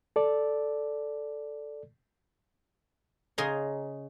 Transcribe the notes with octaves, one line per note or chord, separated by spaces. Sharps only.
A4 D5
C#3 G#4 D#5 A#5 C6